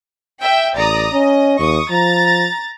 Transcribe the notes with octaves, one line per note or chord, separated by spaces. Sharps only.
E5 G5
A1 D5 A#5 D#6
C#4 D#5
D#2 C#6 D#6
F3 A#5 A6